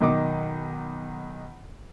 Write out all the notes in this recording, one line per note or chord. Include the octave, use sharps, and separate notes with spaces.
B1 D#3 D#4 D6